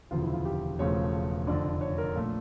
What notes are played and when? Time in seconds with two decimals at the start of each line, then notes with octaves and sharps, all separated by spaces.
0.11 E1 D2 C#3 F3 F4
0.22 E4
0.34 F4
0.45 G4
0.79 E1 E2 C#3 F3 A3 C#5
1.47 F1 F2 D3 D5
1.81 C#5
1.98 A#4
2.15 A#1 A#2 A3 A4